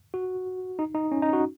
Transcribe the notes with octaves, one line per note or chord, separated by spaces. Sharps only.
F#4
D#4
D#4
C#4
D#4
F#4